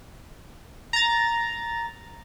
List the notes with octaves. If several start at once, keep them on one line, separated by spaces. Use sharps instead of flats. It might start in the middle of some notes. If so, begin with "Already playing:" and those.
A#5 A6